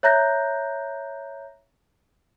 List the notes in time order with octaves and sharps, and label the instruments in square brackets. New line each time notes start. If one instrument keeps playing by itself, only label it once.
[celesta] C#5 E5 A#5 F#6 G6 A#6